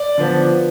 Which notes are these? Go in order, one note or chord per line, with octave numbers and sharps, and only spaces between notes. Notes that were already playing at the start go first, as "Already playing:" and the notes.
Already playing: D5
D3 F3 B3